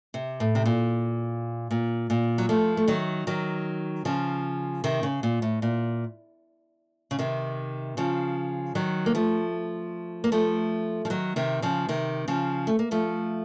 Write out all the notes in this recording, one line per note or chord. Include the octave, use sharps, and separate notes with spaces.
C3
A2
C3
A#2
A#2
A#2
F#3
F3 A3
A3
D#3 F#3
D#3 F#3
C#3 F3
C3 D#3
C#3
A#2
A2
A#2
C#3
C3 D#3
C#3 F3
D#3 F#3
A#3
F3 A3
A#3
F3 A3
F3
D#3 F#3
C3 D#3
C#3 F3
C3 D#3
C#3 F3
A3
A#3
F3 A3